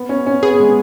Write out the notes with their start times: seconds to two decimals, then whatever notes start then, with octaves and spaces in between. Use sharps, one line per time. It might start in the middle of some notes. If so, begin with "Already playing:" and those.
Already playing: B3
0.09 C#4
0.27 C#4
0.43 B3 G#4
0.60 G#3